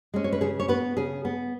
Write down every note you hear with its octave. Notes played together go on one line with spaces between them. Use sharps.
G#3 C#4
C#5
B4
C#3 G#4
C#5
B3 B4
C#3 G#4
B3